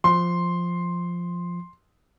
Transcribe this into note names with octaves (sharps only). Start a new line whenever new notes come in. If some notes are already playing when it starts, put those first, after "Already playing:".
F3 C6